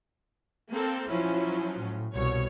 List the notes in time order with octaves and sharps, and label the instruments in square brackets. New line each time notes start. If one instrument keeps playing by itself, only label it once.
[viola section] A#3 C4 A4
[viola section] F3 F#3 C#4 [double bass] E4
[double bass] A2
[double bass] C2 B2 [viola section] C#5